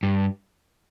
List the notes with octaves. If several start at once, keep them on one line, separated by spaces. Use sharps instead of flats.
G2